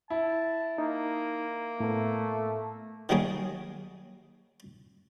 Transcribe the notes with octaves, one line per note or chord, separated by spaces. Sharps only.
E4 A5
A#3 D#4
A2 A3 B3
D#3 F#3 G3 A#3 G#4 C#5